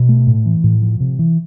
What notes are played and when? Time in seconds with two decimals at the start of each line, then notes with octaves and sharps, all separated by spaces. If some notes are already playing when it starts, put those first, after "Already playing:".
Already playing: B2
0.09 A3
0.27 A2
0.46 E3
0.64 A2
0.82 F3
1.00 C3
1.19 E3